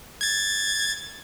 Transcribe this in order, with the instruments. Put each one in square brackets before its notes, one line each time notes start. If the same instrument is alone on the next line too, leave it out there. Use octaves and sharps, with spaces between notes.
[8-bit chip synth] G#6 A6